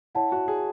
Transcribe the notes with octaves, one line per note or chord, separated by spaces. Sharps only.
E4 C#5 F#5 A5
F#4
G#4